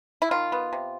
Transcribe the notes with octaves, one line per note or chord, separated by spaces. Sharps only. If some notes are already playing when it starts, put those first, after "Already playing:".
E4
D#3 F4
B3
C3